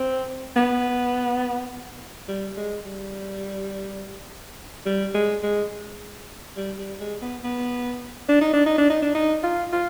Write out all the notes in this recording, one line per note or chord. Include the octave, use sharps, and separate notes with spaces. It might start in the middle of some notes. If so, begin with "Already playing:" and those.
Already playing: C4
B3
G3
G#3
G3
G3
G#3
G#3
G3
G3
G#3
B3
B3
D4
D#4
D4
D#4
D4
D#4
D4
D#4
F4
F4